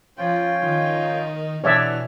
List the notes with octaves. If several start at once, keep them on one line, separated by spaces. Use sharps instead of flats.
F3 C#4 F4 G5
D#3 D#4
B2 E3 D4 F#4 C#5 D5 E5 F6